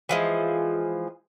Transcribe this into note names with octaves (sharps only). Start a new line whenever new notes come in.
E3 F3 G#3